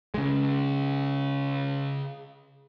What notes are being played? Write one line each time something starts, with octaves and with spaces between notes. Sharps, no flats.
C#3 G#3